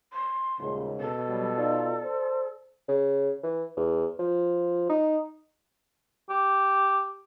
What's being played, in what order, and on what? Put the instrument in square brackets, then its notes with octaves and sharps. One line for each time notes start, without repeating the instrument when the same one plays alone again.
[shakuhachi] C6
[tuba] D#1 [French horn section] D#2 G#2 C#3
[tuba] B2 [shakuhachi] A4
[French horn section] F#3 G3
[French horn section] D#4 F4 [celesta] D5
[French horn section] C5
[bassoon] C#3
E3
E2
F3
D#4
[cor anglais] G4